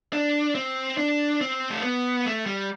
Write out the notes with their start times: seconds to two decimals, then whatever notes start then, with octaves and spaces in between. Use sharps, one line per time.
0.13 D4
0.55 C4
0.97 D4
1.41 C4
1.71 A3
1.82 B3
2.25 A3
2.46 G3